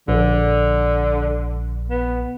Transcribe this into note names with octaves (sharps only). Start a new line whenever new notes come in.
A#1 D3
B3